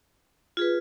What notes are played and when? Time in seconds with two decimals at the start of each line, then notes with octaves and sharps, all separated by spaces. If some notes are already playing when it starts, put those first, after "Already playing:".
0.57 F4 G#4 B4